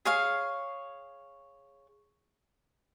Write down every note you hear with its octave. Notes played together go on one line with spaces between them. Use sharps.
G#4 C#5 F5